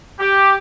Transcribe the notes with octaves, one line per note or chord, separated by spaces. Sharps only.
G4